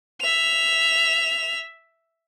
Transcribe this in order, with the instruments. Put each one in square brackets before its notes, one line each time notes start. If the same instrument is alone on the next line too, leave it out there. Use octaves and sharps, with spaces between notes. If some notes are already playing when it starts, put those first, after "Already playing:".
[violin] E5 F7